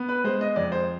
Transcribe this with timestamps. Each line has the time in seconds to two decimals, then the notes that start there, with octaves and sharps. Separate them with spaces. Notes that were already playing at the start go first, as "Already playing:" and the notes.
Already playing: B3
0.09 B4
0.24 G#3 C5
0.41 D#5
0.56 F2 D5
0.72 C5